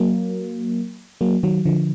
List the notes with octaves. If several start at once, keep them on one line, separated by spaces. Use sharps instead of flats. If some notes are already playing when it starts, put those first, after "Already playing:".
Already playing: F#3 A#3
F#3 A#3
D#3 F#3
D3 F3